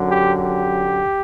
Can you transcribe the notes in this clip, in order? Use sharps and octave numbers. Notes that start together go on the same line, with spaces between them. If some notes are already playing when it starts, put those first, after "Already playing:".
Already playing: F#2 D3 F#3
G4
G4